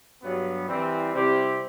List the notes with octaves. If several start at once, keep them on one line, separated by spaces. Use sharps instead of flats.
G2 F#3 B3
E3 G3 C4
C3 G3 C4 E4 G4